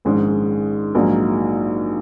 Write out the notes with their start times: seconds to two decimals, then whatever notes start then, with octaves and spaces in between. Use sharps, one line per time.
0.05 A#1 G#2 D#3 G#3 C#4
0.95 A#1 G#2 F#3 A#3